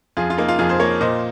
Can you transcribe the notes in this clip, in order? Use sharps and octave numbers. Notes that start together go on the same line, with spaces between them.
F2 F4 G#4
F4
A#3 D#4
F4
F2 F4 G#4
G#4 C5
A#3 A#4 C#5
A#2 C5 D#5